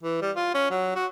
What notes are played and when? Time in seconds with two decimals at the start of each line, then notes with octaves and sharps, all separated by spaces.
0.03 E3
0.21 G3
0.36 F4
0.54 C#4
0.70 F#3
0.95 F#4